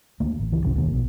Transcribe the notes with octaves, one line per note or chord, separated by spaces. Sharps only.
D2 A#3
A1
C#2 E3
F1 C2 C#4
D2 B2 D#3 A#3
A#1 B2